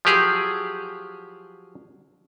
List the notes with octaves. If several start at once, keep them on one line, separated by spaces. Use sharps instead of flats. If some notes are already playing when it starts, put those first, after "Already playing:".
F3 F#3 G4 G#4